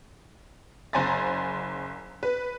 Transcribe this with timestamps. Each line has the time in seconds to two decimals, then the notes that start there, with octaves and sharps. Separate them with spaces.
0.93 F#1 C5 G#5 A#5 B5 A6
2.23 B4